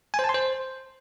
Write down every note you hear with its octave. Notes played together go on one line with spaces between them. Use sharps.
G#5
C5
A5
C6
C5